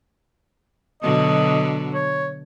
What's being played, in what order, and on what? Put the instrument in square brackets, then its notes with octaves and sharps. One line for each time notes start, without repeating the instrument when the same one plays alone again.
[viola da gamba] B2 D3 F#3 [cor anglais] D#5
[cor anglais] C#5